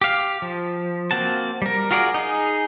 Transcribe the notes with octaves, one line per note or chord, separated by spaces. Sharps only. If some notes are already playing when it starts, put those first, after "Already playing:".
G4 F5
F3
A#3 C4 F#4 A5
G3 A#4
F4 F#4 G#4 A#4 D5
D#4 G#4